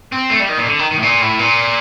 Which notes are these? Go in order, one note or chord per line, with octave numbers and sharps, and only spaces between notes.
C4
A3
G3
D#3
A#2
D3
D#3
D#3
A2
A#2
A2
A#2